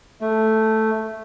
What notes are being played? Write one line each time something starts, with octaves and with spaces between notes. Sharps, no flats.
A3